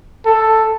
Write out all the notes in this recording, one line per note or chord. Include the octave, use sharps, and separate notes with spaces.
A4